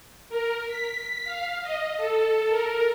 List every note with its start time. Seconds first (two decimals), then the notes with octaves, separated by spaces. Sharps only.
0.29 A#4
0.67 B6
1.24 F5
1.62 D#5
1.97 A4
2.49 A#4